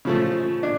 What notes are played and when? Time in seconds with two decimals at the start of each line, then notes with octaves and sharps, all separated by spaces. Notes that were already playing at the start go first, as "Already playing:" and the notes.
0.05 C#3 F3 A3
0.63 D4